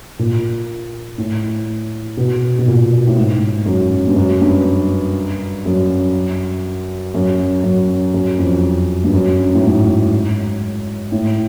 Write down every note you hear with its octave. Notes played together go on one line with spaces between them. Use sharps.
A#2
A2
B2
B2
A#2
A2
G#2
F#2
G2
F#2
G2
F#2
F#2
F#2
F#2
F2
G2
F#2
A2
G#2
A2